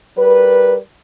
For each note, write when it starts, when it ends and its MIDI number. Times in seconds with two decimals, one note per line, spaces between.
0.18 0.76 55
0.18 0.76 70
0.18 0.76 71